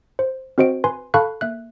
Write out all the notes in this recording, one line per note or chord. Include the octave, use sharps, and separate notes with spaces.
C5
C4 F#4 C5 D#5 D7
B4 G#5 C6
A4 F5 A5 B5 C#6 F#6
A#3 E5 F#6